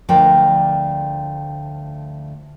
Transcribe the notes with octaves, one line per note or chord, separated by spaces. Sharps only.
D2 F3 A3 A#4 D5 G5